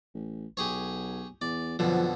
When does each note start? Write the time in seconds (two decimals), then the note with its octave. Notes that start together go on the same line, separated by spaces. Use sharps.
0.14 A1
0.57 B1 G4 G#4 C#5
1.41 E2 D5
1.79 F2 B2 D3 F3 F#3